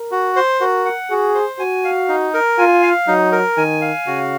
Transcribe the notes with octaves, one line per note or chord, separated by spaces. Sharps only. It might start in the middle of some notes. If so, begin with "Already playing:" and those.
Already playing: A#4
F#4
C5
F#4 A#4
F#5
F#4 G#4
C5
F#4 G#5
F5
D#4
A#4
F4 G#5
F5
F#3 D#4
A#4
D#3 G#5
F5
C#3 F#4